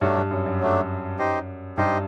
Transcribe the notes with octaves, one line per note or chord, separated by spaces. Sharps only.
G2 F#3 A3 D4
G2
F#2
F#2
F#3 A3 D4
D#4 G4 C5 D#5
G2 D#4 G4 C5 D#5